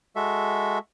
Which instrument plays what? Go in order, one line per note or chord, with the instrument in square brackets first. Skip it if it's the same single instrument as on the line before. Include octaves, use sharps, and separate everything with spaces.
[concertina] G#3 F#4 A4 E5